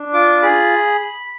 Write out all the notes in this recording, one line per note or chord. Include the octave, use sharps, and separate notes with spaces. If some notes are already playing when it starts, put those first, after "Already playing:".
Already playing: D4
F4 D6
G#4 B5